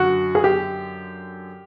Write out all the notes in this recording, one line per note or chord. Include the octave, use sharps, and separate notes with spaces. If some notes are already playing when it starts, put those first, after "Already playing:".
Already playing: F#2 D3 F#4
G#4
G4